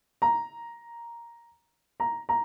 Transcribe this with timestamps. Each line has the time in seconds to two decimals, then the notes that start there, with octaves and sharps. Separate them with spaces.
0.22 A#5
2.00 A#5
2.29 A#5